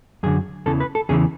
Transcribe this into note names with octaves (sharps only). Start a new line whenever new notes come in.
F#2 D3 G#4
E2 C#3 E3 A4
B4
A4
E2 C#3 E3 G#4